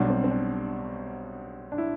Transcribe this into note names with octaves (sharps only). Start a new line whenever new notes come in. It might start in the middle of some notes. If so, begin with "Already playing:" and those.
Already playing: B1 B2 G3 D4
C4
C4
D4
D4
E4